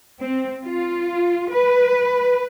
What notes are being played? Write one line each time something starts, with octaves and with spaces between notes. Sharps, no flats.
C4
F4
B4